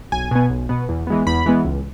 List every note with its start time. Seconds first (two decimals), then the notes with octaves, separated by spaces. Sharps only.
0.12 B1 G#5
0.31 B2 B3
0.50 B1
0.69 B2 B3
0.89 E2
1.07 E3 G#3 B3
1.26 E2 B5
1.46 E3 G#3 B3
1.65 C#2